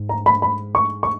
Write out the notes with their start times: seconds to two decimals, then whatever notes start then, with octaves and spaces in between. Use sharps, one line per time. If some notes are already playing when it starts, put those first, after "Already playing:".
Already playing: G#2
0.09 A#5
0.26 B5
0.42 B5
0.75 C#6
1.03 C#6